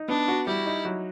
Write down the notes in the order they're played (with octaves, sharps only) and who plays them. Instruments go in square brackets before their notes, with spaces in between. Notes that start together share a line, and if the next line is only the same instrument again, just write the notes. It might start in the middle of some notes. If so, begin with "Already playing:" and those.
Already playing: [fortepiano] D#4
[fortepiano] B3 [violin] D4
[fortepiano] F#4
[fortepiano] G3 [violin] E4
[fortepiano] D#4
F#3